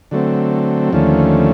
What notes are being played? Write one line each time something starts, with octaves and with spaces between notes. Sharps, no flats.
D3 F#3 A3 C4
D#2 D3 F3 A3 C#4